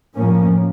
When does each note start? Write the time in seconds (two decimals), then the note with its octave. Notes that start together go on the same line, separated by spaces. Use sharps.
0.15 A2 F3 A#3 C#4